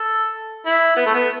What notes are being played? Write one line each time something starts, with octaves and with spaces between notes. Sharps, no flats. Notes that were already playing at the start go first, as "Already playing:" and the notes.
Already playing: A4
E4
B3
A3
B3